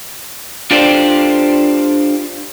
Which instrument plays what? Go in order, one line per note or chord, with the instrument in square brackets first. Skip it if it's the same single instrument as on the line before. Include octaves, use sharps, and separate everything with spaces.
[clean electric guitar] D4 F4 G4 A4 C5 D5